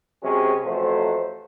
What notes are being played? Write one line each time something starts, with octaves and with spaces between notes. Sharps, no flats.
C3 F#3 G#3 C#4 G#4
A1 F2 F#3 A3 C5